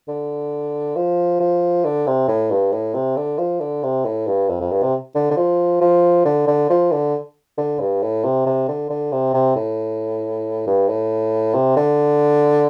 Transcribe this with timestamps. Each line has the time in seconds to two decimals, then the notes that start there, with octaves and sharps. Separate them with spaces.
0.08 D3
0.96 F3
1.40 F3
1.85 D3
2.07 C3
2.28 A2
2.50 G2
2.72 A2
2.94 C3
3.17 D3
3.38 F3
3.60 D3
3.83 C3
4.05 A2
4.27 G2
4.49 F2
4.60 F2
4.71 G2
4.82 C3
5.15 D3
5.31 D3
5.37 F3
5.81 F3
6.25 D3
6.47 D3
6.70 F3
6.92 D3
7.58 D3
7.80 G2
8.02 A2
8.24 C3
8.46 C3
8.68 D3
8.90 D3
9.12 C3
9.34 C3
9.56 A2
10.67 G2
10.88 A2
11.54 C3
11.76 D3